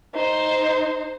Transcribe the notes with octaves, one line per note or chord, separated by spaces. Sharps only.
D#4 C5